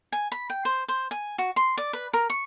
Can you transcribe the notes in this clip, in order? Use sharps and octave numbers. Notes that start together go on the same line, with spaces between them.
G#5
B5
G5
C5
C5
G#5
F#4
C6
D5
B4
A#4
C#6